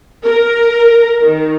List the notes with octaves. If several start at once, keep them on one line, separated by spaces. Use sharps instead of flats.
A#4
D#3